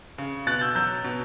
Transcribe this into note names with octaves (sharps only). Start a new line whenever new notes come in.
C#3
B2 F#6 A6
E6 G6
F#3 E6 G6
B2